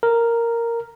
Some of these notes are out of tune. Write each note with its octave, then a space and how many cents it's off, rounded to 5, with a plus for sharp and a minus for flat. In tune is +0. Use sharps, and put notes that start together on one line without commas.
A#4 -5